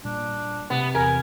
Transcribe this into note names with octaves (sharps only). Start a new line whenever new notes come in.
A#2 G3 D4
C3 B3
E2 A#4 G#5